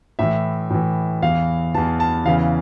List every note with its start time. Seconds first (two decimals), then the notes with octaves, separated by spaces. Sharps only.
0.19 A2 E3 E5
0.70 A2 E3
1.22 E2 E3 F5
1.74 E2 E3 A5
2.00 A5
2.25 E2 C#3 E3 F5